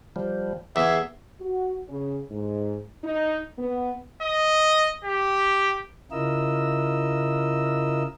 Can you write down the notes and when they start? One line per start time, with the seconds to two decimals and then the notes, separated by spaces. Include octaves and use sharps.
0.16 F3 G3
0.76 E2 G#4 E5
1.41 F#4
1.89 C#3
2.30 G#2
3.04 D#4
3.58 B3
4.22 D#5
5.05 G4
6.11 C#3 E4 F4 A#4 D#5 E6